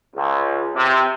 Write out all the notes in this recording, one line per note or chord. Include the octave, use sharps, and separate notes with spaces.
C#2
C3